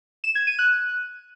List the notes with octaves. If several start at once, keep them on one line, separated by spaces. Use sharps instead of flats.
E7
G#6
D#7
F#6